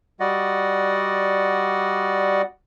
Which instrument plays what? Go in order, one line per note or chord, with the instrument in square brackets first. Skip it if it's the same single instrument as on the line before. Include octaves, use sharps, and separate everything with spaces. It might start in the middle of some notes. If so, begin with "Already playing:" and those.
[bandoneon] G3 F#4 D5 D#5 F#5